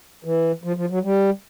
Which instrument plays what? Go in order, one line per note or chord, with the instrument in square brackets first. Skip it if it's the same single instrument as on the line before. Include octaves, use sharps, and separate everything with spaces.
[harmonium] E3
F3
F3
F#3
G3